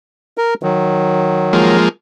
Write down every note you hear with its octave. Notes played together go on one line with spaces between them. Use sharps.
A#4
D#3 F#3
F3 G#3 A#3